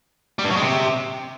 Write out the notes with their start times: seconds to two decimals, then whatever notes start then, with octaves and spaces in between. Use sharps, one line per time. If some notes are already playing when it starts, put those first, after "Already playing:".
0.39 G3
0.44 G2
0.50 F#3
0.56 G#3
0.62 C3